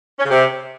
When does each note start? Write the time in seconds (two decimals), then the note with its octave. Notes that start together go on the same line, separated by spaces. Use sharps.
0.19 C#4
0.24 C#3
0.30 C3